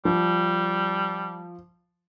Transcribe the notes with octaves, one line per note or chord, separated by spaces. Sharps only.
F3 G3